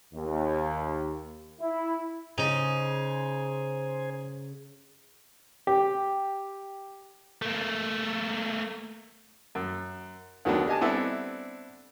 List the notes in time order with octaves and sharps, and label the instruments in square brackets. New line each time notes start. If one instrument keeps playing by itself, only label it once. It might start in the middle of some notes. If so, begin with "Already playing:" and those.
[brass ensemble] D#2
E4
[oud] C#3 [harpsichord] D#4 [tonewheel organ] C5 G#5
[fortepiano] G4
[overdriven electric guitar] A3 A#3
[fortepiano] F#2
D#2 D#3 F#3 A3 B3 D4
G4 D#5 G#5 A5
G3 B3 C4 D4 E4 A4